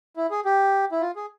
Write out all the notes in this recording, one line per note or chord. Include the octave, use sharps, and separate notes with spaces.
E4
G#4
G4
E4
F4
G#4